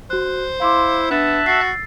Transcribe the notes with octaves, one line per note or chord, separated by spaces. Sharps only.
F#4 C5 F#6
E4 F5 C6 D6
B3 D4 E5 A5 F#6
F#4 E6 A6 C7